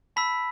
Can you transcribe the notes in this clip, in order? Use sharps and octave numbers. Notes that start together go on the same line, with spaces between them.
A5 B5 E6 B6